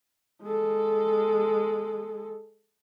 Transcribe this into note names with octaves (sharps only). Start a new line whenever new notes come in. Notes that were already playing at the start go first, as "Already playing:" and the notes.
G#3 A4